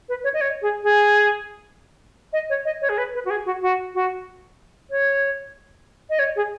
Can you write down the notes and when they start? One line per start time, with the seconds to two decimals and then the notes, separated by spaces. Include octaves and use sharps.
0.09 B4
0.24 C#5
0.34 D#5
0.41 C#5
0.62 G#4
0.83 G#4
2.33 D#5
2.50 C#5
2.65 D#5
2.81 C#5
2.89 G#4
2.98 B4
3.14 B4
3.25 F#4
3.30 G#4
3.45 F#4
3.62 F#4
3.94 F#4
4.90 C#5
6.10 D#5
6.19 C#5
6.36 G#4